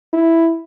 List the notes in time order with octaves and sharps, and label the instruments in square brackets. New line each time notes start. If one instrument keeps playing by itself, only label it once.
[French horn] E4